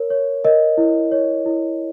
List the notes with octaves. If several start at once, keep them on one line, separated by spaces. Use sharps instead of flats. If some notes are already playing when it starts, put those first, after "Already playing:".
Already playing: A#4 C#5
C#5
A#4 D#5
E4
C#5
E4